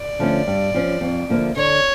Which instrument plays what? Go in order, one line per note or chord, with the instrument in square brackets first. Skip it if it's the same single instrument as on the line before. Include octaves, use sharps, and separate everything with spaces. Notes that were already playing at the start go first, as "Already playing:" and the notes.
Already playing: [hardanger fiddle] D5
[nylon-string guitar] D3 F3 A3 C#4
G2
F3 C#4
F2
D3 F3 A#3 E4
[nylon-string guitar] D3 [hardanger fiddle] C#5